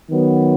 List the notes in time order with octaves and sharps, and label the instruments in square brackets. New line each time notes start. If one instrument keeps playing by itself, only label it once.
[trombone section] D#3 F#3 B3